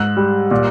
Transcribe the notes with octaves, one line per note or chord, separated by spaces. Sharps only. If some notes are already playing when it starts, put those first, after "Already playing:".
Already playing: G#2 E6 F#6
G3
A#2